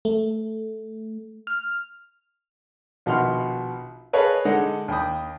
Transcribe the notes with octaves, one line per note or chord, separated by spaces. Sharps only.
A3
F6
A#1 B2 D#3 F#5 C6 F6
G#4 B4 C#5 D#5 F5 A5
D3 G#3 D#4 F#5
D#2 G5 B5 D#6